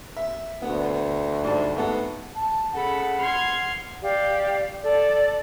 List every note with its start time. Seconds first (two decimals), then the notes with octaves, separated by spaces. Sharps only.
0.17 E5
0.62 D2 B3
1.44 G#2 G3 A5
1.76 G#2 A3 B3 A4
2.36 A5
2.73 C#3 A4 F#5 B5
3.19 C6 F6 G#6
4.02 G4 D5 F5
4.82 A4 D5